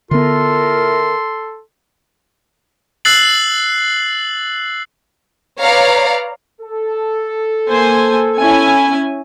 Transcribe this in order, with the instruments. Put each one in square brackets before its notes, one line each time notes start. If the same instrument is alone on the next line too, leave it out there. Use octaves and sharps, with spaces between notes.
[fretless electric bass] D3 B3 [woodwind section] E4 F4 A#4 [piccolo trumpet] A4 [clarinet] C6
[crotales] E6 F#6 A6 C7 F#7
[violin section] B4 C#5 D5 F5 A#5
[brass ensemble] A4
[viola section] A#3 C5 G#5
C#4 E4 G#5